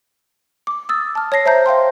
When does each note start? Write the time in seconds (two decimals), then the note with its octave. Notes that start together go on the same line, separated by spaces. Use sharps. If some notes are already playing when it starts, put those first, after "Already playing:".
0.67 D6
0.89 D#6 E6 A6
1.15 A5 F6
1.32 C#5 A5 A#6 C7
1.46 C5 E5 A5 A#5 G6
1.66 C5 F5 G5 C6